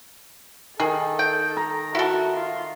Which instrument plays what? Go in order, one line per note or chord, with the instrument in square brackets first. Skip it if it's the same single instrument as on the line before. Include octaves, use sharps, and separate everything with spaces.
[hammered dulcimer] D#3 [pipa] G#4 [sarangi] A4
[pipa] G5
[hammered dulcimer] A#5
[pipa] E4 A4 [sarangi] F#4
[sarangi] F4